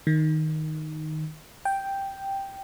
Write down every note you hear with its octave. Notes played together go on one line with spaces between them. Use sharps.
D#3
G5